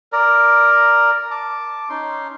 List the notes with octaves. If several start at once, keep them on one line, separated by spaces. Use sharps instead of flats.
A#4 D5 A#5
A5 D6
C#4 D#4 C6